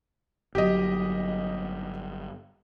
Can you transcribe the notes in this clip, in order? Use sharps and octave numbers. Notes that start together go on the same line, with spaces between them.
G1 F#3 G4 D#5